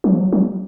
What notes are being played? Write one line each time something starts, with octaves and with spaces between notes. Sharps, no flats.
F#3
F3
F#3
F#3